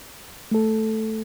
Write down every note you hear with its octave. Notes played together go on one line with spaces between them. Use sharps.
A3 A4